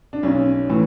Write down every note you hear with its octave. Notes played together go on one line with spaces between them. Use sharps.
D4
B1 C#4
A2 E3